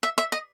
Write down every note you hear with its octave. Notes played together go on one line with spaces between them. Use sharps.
E5
E5
D#5